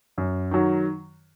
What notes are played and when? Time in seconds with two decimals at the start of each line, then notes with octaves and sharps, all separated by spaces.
0.18 F#2
0.51 D#3 F#3